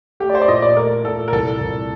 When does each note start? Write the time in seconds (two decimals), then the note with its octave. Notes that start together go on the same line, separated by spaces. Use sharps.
0.20 A3 G4
0.30 D5
0.35 C5
0.42 D5
0.48 A#2 D#5
0.62 D5
0.77 A3 A#4
1.04 A#2 A4
1.28 A#4
1.32 C2 A4
1.61 C2